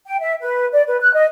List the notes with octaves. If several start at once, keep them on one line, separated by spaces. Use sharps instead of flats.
G5
E5
B4
D5
B4
F#6
D#5